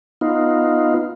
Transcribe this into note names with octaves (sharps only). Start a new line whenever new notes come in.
B3 D#4 F4